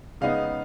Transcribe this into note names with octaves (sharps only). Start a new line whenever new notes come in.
C#3 G#3 B3 D#4 F5